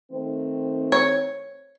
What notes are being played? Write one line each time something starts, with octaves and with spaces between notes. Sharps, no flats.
D#3 A3 C4
C#5